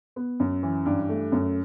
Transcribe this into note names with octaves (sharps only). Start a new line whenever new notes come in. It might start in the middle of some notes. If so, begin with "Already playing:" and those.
B3
F#2
E3
G2
A3
F#2